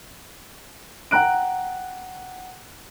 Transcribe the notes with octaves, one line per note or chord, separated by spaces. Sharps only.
F#5 G5 A#5 F#6 D7